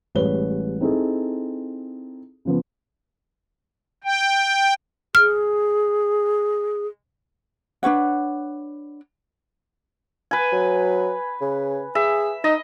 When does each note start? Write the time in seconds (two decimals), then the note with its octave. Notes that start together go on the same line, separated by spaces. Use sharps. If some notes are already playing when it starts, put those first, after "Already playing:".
0.15 A1 G3 G#3 B4 C#5 G7
0.81 C4 D#4 E4 G#4 A4
2.45 C#3 F3 B3
4.04 G5
5.15 G#4 F6
7.83 D4 B4 C#5 F#5
10.31 B4 G#5
10.52 F#3
11.41 C#3
11.95 G#4 E5
12.44 D#4 D#5